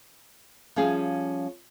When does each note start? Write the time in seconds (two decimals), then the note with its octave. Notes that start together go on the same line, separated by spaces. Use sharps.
0.76 F3 G3 C#4 G#4 F5